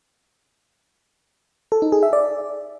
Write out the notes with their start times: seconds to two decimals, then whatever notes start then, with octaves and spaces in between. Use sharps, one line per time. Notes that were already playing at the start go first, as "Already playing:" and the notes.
1.72 A4
1.82 D#4
1.92 G#4
2.03 E5
2.13 D5